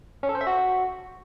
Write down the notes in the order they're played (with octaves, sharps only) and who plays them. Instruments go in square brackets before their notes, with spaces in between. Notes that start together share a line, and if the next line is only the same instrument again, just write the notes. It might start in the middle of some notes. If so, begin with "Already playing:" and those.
[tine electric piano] C#4
A4
C5
E5
F#4